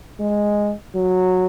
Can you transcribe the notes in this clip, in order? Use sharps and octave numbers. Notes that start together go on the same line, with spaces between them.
G#3
F#3